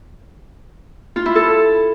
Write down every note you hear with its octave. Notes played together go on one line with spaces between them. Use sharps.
F4
E4
A4